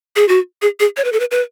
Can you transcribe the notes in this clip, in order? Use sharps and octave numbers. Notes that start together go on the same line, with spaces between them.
G#4
F#4
G#4
G#4
C#5
B4
A4
B4
B4